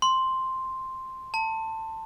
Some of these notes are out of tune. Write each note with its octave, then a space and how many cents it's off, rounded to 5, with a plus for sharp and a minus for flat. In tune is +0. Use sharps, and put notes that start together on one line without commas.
C6 +0
A5 +20